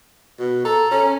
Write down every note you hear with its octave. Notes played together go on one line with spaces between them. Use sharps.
B2
A4 A#5
C#4